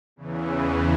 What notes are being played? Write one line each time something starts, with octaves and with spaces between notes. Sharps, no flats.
E2 C#3 E3